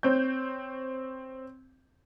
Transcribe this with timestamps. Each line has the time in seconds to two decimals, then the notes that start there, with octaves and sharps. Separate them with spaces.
0.03 C4 C#5 G6